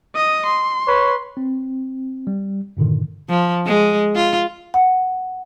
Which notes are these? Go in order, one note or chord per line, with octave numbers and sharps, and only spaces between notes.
D#5 D#6
C6
B4 C#5
C4
G3
G2 A#2 D3 D#3
F3
G#3
F4
F#5